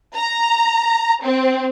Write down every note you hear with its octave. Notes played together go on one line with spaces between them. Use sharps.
A#5
C4